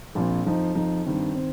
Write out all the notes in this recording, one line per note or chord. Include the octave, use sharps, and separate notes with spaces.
A#1 A#2 F3 C4
F2 F3 D#4
F2 F3 D#4
G2 D#3 C4
D#3 C4